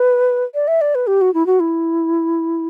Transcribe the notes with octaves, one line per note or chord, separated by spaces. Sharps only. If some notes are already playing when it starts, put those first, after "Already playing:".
Already playing: B4
D5
E5
D5
B4
G4
F#4
E4
F#4
E4